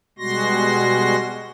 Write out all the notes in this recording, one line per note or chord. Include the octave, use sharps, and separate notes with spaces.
B2 G3 G#3 F#4 C6 A#6